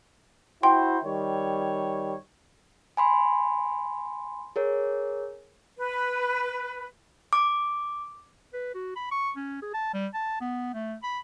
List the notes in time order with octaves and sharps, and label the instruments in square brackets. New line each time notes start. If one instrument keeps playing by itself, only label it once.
[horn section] E4 F#4 C5 [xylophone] G5 C6
[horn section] D#3 G3 C#5
[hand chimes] G#5 B5 C6
G#4 A#4 C#5
[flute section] B4
[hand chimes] D6
[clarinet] B4
F#4
B5
C#6
C#4
G#4
A5
G3
A5
B3
A3
B5